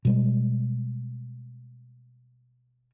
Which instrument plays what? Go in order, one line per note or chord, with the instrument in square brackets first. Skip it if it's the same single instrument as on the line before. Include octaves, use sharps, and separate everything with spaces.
[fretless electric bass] B2 G3 G#3